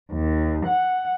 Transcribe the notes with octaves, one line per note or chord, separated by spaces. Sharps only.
D#2
F#5